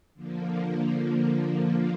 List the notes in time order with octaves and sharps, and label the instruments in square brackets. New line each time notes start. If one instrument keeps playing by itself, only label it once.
[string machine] D3 F3 A#3